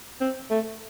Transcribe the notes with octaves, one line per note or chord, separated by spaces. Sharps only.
C4
A3